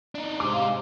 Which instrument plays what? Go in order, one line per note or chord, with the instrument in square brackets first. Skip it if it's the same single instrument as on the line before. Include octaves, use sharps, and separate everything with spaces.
[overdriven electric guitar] D4 D#4
[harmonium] C3 G#3 [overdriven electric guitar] G#4 C5 [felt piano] D6
[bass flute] F5